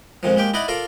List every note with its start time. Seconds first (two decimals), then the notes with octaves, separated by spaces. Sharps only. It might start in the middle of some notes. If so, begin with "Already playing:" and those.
0.23 F2 G#2 D#3 F3
0.36 G#3 A#3 G4 G5
0.54 D#4 E4 D5 D#5 F#5
0.68 F4 A4 A#4 D5 F5